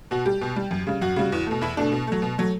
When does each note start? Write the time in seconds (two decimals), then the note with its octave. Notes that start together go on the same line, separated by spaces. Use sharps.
0.11 B2 F#4
0.26 G3 G4
0.41 B2
0.56 G3
0.71 F#2
0.87 C#3 G3
1.01 F#2 F#4
1.16 C#3 G3
1.32 E2
1.47 B2 A3
1.61 E2 E4
1.77 B2 A3 D4
1.92 B2
2.07 F#3 A3
2.22 B2
2.38 F#3 A3